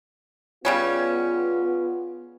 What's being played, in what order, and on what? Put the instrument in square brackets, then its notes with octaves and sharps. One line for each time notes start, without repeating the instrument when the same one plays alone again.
[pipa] C#3 G3 C#4 [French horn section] B3 F4